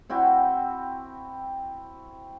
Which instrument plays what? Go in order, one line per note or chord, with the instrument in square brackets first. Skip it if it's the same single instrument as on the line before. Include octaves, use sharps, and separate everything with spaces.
[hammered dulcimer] C4 E4 F#4 G5